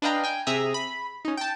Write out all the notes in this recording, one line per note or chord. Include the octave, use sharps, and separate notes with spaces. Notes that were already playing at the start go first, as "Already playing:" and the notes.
D4 B4 D#5 F5 G5 A#5
G5 G#5
C3 G#4 E5 A#5 D#6
B5
C#4 D#4
G5 A5